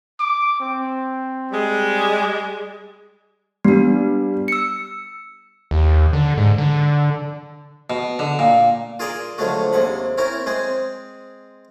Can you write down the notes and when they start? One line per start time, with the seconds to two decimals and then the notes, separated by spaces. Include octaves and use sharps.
0.20 D6
0.60 C4
1.52 G3 G#3
3.65 G3 B3 D4
4.48 E6 C#7
5.71 D#2
6.13 D3
6.37 G#2
6.58 D3
7.90 B2
8.19 D3
8.39 A#2
9.00 F4 G#4 A#4 D5 D#5
9.38 D3 F3 F#3 G#3 A3 F#4
9.73 D#2 C3 G#3 F#5 B5
10.18 C4 C#4 E4 A#4
10.46 G#3 C4 G#4